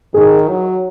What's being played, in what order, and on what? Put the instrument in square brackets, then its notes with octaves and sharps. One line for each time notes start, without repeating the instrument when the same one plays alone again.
[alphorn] D#3 [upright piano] G#4
[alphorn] F#3